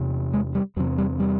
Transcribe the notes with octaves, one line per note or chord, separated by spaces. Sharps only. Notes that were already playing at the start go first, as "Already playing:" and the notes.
Already playing: E2 C3
G#3
G3
E2 C3 F#3
G3
G3